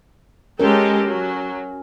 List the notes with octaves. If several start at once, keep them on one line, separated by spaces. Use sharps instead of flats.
G#3 C#4 G4 A4 A#4
F#3